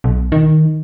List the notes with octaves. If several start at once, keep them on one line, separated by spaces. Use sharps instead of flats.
B1
D#3